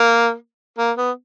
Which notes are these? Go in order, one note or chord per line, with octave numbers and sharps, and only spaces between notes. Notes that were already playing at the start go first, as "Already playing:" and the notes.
Already playing: A#3
A#3
B3